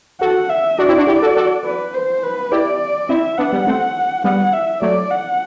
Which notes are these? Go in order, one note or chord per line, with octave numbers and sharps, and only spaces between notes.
F#4 A4 F#5
E5
D4 F#4 D5
C4 E4
D4 F#4
E4 G4
F#4 A4
F#4 A4
B4
C5
B4
E4 G4 D5
C4 E4 E5
B3 D4 F#5
G3 B3
A3 C4
G3 B3 F#5
E5
F#3 A3 D5
F#5